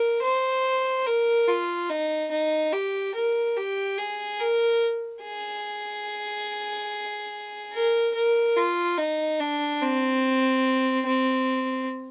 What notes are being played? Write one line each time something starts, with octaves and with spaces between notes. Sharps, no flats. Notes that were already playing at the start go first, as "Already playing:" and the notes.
Already playing: A#4
C5
A#4
F4
D#4
D#4
G4
A#4
G4
G#4
A#4
G#4
A#4
A#4
F4
D#4
D4
C4
C4